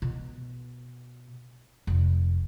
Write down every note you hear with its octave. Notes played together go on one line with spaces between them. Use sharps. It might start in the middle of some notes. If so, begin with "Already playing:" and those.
B2
F1